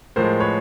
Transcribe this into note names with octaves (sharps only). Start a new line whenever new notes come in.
A2 F3 G#3 A#4 C5
B4 C#5